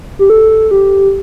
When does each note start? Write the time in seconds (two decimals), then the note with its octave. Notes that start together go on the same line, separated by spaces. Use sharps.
0.19 G4
0.30 A4
0.71 G4